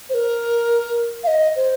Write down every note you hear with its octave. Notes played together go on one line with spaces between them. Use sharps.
C5
A#4
F5
D#5
C5